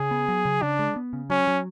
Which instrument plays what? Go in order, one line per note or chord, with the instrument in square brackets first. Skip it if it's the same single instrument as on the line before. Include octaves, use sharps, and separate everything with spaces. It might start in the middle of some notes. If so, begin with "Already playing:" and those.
Already playing: [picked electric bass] C#3 [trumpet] G#4
[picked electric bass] B3
F#3
C#3
[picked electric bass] C#3 [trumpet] D4
[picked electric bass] G#3
B3
C#3
[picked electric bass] F#3 [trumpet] C#4
[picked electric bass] F#3